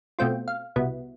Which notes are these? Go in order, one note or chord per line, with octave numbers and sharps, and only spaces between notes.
B2 A3 C4 F4 G5
F5
C2 B2 B3 E4